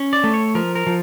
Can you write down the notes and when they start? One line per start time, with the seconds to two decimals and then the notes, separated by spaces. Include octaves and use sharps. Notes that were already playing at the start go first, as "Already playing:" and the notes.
Already playing: C#4
0.13 D5
0.24 A3
0.34 C#5
0.55 F3 A#4
0.75 A#4
0.87 F3